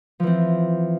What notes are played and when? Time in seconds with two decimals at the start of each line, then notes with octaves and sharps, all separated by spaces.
0.20 F3
0.23 E3
0.27 C4